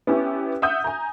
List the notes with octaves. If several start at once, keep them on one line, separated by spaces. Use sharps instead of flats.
B3 C#4 E4 G4
E5 F#5 D#6 G6
G#5 A#5